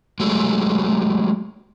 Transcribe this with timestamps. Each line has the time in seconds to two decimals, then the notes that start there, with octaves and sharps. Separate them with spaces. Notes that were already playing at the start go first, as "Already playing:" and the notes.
0.20 F#3 G#3 A3